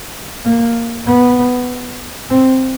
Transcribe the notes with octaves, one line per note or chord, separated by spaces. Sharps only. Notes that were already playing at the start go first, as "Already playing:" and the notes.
A#3
B3
C4